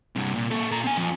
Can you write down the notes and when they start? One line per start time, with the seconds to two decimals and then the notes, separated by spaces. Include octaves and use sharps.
0.16 G2 C3
0.36 A#2
0.51 A#3 A4
0.71 A#2 A#5
0.84 C4 G#5
0.97 F2